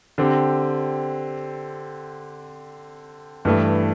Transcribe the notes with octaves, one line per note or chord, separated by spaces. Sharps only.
D3 C4 G4
G2 E3 A3